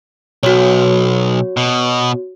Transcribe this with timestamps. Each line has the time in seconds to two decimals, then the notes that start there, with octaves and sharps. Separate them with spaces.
0.43 B1 F#4 C#5
1.57 B2